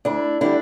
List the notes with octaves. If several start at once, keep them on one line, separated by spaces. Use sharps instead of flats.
D2 D4 E4
D3 G3 D4 E4